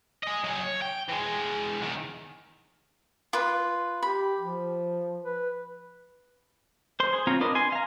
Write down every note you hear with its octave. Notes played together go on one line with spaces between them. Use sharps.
G#4 D#5
F#3 G#4
C#5
G5
E3 G#3
E2 D#3
F4 B4
G4 B5
F3
B4
C5 C6
G#4
C4 F4 C#5 F5 A#5
D4 A#4 B4 D5 D#5
G#5 C6
F5 A#5